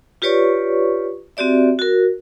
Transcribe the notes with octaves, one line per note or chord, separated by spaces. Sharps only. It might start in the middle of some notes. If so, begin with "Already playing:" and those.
F4 G4 B4 C#5 D5 C#6
C4 F#4 G4 D5 E5
F#4 A#4